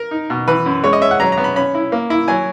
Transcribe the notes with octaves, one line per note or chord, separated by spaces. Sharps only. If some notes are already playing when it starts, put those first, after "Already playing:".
Already playing: A#4
D#4
B2
E3 B4
F#2
G#3 C#5
D#5
C#4 E5
F#5
F#3 A#5
A#5
B3
B5
C#4 B5
E4
A#3
E4
F#3 G#5